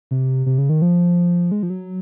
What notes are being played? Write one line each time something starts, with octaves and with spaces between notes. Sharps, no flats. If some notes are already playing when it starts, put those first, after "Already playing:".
C3
C3
C#3
D#3
F3
G#3
F3
F#3